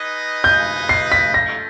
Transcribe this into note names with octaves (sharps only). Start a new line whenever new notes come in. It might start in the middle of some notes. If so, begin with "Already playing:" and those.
Already playing: D#4 G#4 B4 D#5
G6
C7
B6
A3 C#4 F4 A4 C5 A#6